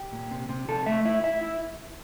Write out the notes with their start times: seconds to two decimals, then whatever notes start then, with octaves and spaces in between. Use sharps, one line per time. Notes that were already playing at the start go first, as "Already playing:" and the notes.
Already playing: G4
0.12 A#2
0.31 C3
0.49 C3
0.68 C3 A4
0.86 A3 E5
1.05 E4 E5
1.24 E4 E5
1.41 E4